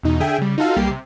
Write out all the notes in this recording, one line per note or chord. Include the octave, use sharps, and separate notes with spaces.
E2 B2 D#4
D3 G#4 E5 G5 G#5
C#3 G3
D#4 F4 F#4 A4 F5
B1 G3 A#3 G4 C7
C3